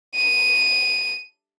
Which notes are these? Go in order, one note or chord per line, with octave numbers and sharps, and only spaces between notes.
D#7